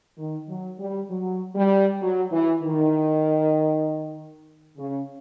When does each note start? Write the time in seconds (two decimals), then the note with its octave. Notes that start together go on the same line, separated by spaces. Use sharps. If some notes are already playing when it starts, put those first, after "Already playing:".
0.18 D#3
0.49 F#3
0.79 G3
1.10 F#3
1.55 G3
2.02 F#3
2.32 E3
2.63 D#3
4.78 C#3